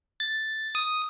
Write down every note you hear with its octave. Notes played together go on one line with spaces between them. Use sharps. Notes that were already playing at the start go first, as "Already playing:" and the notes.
A6
D#6